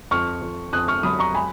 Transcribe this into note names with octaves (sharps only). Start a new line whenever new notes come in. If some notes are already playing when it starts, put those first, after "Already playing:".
F2 C#6 F6
F2
F2 D#6 F#6
C#6 F6
F#3 B5 D#6
A#5 C#6
G#5 B5